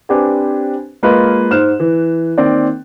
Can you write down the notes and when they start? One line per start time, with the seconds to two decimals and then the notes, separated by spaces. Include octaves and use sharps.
0.09 C4 D4 G4 B4 C5 G#5
1.03 G#3 A#3 F4 B4 D#5
1.51 G#2 C5 F6 F#6 E7
1.80 E3
2.38 D#3 A#3 C4 D5